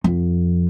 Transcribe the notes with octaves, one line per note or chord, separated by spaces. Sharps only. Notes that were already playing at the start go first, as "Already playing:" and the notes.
F2